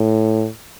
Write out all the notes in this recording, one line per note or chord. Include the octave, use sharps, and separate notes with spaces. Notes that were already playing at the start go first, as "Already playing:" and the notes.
Already playing: A2